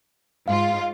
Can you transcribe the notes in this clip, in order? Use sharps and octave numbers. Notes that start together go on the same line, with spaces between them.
G#2 F4 F5